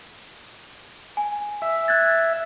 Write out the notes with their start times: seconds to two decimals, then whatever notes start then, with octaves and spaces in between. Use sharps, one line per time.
1.17 G#5
1.62 E5
1.88 F#6 G#6 A6